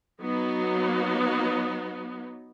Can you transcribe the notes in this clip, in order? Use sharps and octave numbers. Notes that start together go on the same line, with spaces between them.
F#3 B3 D#4